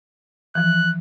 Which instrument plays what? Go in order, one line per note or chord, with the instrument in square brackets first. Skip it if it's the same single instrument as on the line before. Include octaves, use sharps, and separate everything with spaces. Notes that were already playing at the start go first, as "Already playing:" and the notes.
[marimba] E3 F3 [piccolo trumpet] F#6